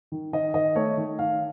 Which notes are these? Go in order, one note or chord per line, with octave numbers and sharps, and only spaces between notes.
D#3
D#3 D#5
D#3 D#5
A3 C#5
D#3
D#3 F5